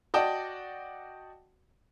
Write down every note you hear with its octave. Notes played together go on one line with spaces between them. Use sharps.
F#4 D5 D#5 G5 A5